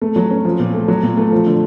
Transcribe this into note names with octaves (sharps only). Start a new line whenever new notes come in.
A3
F#3
C#4
F3
A#2
A3
F#3
A#2
A3
F3
D3